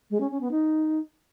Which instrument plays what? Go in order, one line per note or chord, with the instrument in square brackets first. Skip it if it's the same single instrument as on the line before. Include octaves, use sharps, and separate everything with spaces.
[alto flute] G#3
C#4
C#4
B3
D#4